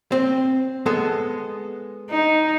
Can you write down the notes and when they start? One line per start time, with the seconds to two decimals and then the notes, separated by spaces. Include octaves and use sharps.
0.12 C4
0.86 G#3 B3 A4
2.10 D#4